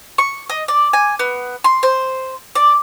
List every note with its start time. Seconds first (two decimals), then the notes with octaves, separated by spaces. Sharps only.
0.18 C#6
0.50 D#5
0.68 D5
0.93 G#5
1.19 B3
1.64 C6
1.83 C5
2.55 D5